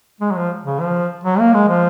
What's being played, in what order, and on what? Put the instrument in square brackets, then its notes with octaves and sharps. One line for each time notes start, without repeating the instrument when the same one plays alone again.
[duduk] G#3
F#3
F3
C#3
F3
F#3
A#3
G#3
F3